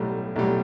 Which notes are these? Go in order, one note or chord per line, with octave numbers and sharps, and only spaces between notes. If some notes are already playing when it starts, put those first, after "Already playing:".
Already playing: B1 A2 G3
B1 A2 G3